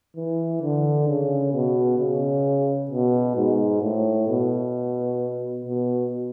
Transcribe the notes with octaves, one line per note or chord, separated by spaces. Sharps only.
E3
D3
C#3
B2
C#3
B2
G#2
A2
B2
B2